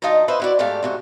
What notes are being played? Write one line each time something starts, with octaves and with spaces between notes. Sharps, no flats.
D2 D#4 F4 D#5 A5 A#5
B4 C5 D#5 E5
E4 F#4 D5
G#2 A3 G4 D5 F5 A5
G#2 C3 F#4